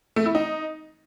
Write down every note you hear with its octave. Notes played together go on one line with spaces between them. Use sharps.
A3
E4
D#4